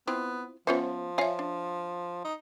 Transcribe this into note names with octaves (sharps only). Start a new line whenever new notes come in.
B3 C4 E4 F4
F3 B3 C#4 F4 B4 C5 E5
F4 C#5 E5 F5 G#5
D4
D#4